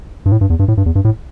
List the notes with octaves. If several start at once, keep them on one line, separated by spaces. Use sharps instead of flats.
G2
A2
G2
E2
G2
A2
G2
E2
G2
A2